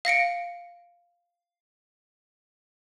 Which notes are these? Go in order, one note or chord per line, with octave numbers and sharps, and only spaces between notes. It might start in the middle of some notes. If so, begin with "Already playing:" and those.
F5 A#6 C#7 D7